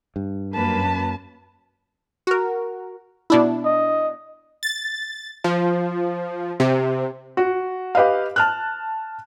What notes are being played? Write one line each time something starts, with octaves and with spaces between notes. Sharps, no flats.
G2
F#2 A#3 B4 A5
F#4 A#4
B2 D4 E4
D#5
A6
F3
C3
F#4
G4 B4 D#5 F5
A5 F6 F#6